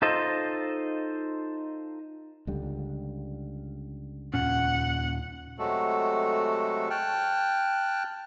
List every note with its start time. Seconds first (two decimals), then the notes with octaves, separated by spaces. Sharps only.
0.02 D#4 F4 A4 C5 D#5
2.47 C#2 D3 G3
4.34 D#2 A#2 C#4 F#5
5.59 C3 F#3 G#3 A3 F#4 A4
6.90 G5 A5 F6 F#6